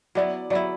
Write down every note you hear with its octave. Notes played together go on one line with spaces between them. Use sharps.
F#3 B3 E4 D5
F#3 B3 E4 D5